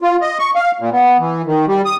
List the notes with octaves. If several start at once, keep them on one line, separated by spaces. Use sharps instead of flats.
F4
D#5
C#6
F5
A#2
B3
E3
D#3
G3
D#6